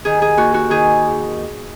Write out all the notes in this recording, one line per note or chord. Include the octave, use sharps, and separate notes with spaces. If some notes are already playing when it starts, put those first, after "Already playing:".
D#3 G#4
G#4
D#2 F#4
F#4
D#3 G#4